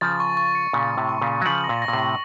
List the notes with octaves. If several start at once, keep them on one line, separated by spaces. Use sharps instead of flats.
C#3 F3 A6
C#6
C#6
C#7
A#2 C#3 C#6
A6
A2 C3
C#6
A#2 C#3
C#6
F#3
C#3 F3 F#7
A#6
A#2
A#6
A#2
A2 C3
A#6